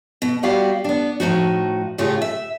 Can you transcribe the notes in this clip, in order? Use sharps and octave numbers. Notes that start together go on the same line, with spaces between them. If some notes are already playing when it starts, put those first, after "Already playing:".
B2
G3 B3 E4 F#4 G4 F5
B3 D4
A2 F3 D#4 F#4
A2 C#3 A3 F4 G4 G#4
E5